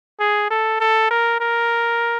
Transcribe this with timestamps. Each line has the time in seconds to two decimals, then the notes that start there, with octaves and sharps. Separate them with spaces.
0.20 G#4
0.50 A4
0.80 A4
1.11 A#4
1.40 A#4